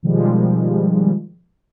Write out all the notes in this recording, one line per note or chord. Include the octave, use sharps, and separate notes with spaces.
B2 D#3 F3 G3 G#3